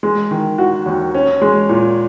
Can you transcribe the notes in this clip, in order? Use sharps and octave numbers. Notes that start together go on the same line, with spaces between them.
G#3
D#3
F#4
D#2
C#4
G#3
A#2